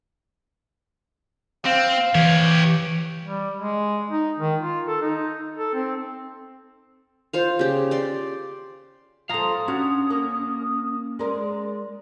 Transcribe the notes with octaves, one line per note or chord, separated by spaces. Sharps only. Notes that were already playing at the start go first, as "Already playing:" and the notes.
C4 F5
E3 G4 C#5
G3
G#3
D#4
D#3
F4
A4
D#4
A4
C4
F4 C5 F5
C#3 G4
D5 C6
F3 A4 F5 A#5 D#6
C#4 D4 F#4
A#3
G#3 A#4 D5